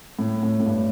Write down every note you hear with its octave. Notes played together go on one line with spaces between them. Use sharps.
A2
A2
A2
G2